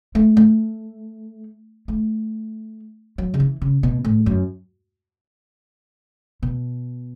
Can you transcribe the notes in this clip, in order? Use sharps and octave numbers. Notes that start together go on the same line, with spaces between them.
A3
A3
A3
F#3
C#3
E3
C#3
B2
A2
F#2
B2